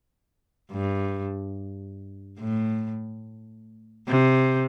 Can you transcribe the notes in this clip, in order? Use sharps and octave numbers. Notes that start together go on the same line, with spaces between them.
G2
A2
C3